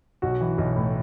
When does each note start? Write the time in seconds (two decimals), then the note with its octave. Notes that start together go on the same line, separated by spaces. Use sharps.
0.22 B1 F#4
0.41 E3
0.58 B1
0.76 A2